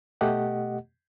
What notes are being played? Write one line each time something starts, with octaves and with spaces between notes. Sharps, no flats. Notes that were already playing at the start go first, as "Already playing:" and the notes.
B2 A3 G4 D#5 F#5